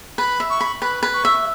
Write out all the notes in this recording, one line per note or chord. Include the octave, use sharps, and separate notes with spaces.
B4 B5
E5
C#6
B5
B4 B5
B4
C#6
E5